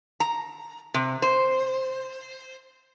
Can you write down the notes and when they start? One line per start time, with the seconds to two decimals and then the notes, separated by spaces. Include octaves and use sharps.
0.20 A#5
0.94 C3
1.22 C5